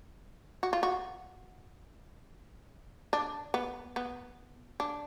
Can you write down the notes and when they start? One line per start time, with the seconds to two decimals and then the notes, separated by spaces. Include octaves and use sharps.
0.63 F#4
0.73 F4
0.83 F#4
3.13 D4
3.54 B3
3.96 B3
4.80 D4